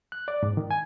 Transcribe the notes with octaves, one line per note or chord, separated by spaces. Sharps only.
F#6
D5
G#2
D#3
G#5